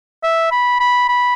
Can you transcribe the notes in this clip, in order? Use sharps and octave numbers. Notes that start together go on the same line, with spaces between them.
E5
B5
B5
B5